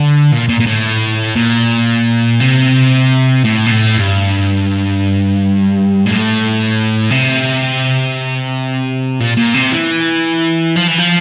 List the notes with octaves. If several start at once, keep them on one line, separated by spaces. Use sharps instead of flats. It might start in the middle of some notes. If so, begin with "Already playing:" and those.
Already playing: D3
A#2
A#2
A#2
A2
A#2
C3
A2
A#2
A2
G2
A2
C3
A#2
A#2
C3
E3
F3
E3
F3